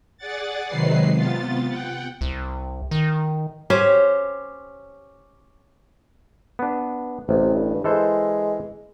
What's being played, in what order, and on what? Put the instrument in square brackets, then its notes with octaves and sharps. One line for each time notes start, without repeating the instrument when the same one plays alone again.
[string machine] G#4 D5 F#5 A6
C3 D#3 F#3 G#3 B4 C7
C3 B3 F4 A6
F#5 G5
[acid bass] C2
D#3
[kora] C#4 G4 C5
[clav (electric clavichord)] B3 D4
[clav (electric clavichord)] A1 [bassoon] C3
[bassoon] G2
[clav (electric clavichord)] E3 A4 C5 [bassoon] G#3